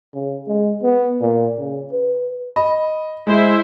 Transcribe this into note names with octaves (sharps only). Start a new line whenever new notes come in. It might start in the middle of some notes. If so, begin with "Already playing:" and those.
C#3
G#3
B3
A#2
C#3
B4
D#5 B5
G#3 E4 C5 E5